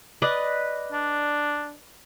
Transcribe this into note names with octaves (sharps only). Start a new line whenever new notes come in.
B4 D5 D#5
D4